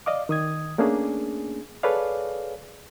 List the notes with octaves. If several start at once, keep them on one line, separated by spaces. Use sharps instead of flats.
D5 D#5 F5 D6
D#3 D#6 G#6
A3 A#3 C#4 D4 G#4
G#4 A4 B4 C#5 D5 F5